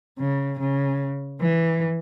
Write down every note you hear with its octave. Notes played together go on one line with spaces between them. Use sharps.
C#3
C#3
E3